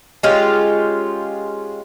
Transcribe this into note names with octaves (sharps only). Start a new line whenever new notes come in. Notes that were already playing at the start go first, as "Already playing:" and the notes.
G#3 C#4 F4 G4